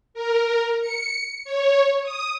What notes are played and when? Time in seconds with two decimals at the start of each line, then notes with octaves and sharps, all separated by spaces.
0.14 A#4
0.81 C#7
1.45 C#5
2.03 D#6